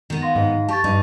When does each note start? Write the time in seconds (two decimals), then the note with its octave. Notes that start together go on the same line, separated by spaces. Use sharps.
0.10 D#3 B3
0.22 F5 C6 A#6
0.36 G#2
0.68 G4 A5 C#6 A6
0.84 G2 D#4